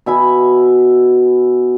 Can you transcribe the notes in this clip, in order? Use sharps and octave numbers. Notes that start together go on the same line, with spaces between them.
B2 E5 G#5 B5